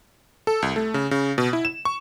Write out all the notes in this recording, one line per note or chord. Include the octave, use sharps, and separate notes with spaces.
A4
C2
A3
C#3
C#3
B2
E4
E7
C#6